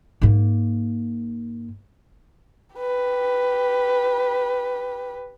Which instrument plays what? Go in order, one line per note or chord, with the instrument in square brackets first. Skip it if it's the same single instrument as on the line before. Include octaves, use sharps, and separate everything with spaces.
[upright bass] G#2 A#3
[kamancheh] G4 B4